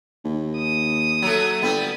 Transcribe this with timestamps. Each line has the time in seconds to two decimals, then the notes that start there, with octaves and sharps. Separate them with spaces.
0.25 D#2
0.57 D#6
1.22 F#3 A3
1.62 G1 G3 B3